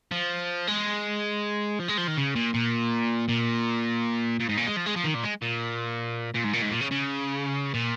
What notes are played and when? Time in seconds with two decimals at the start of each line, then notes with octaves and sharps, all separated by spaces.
0.12 F3
0.68 G#3
1.79 F3
1.88 G#3
1.97 F3
2.07 D#3
2.17 C#3
2.35 A#2
2.54 A#2
3.29 A#2
4.40 A#2
4.49 G#2
4.58 A#2
4.67 G#3
4.77 F3
4.86 G#3
4.96 F3
5.04 D#3
5.14 A#2
5.23 G#3
5.42 A#2
6.35 A#2
6.45 G#2
6.54 A#2
6.62 G#2
6.71 A#2
6.81 C#3
6.91 C#3
7.74 A#2